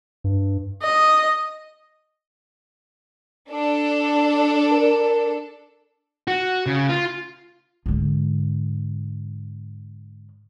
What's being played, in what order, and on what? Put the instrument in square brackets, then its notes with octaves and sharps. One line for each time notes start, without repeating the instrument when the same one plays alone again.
[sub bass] G2
[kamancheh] D#5
[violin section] D4 A4
[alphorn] A#4
[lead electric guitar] F#4
C#3
F4
[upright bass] G#2 D3